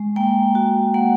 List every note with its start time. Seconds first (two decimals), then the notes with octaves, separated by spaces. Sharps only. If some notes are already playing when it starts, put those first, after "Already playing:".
Already playing: G#3
0.16 A#3 G5
0.55 F#4
0.94 A#3 F#5